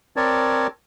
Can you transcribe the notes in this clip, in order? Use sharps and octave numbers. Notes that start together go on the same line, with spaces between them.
C4 A#4 C#5 D5 A5